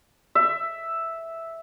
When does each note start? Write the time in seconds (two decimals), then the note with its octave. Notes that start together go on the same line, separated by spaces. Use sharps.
0.35 E5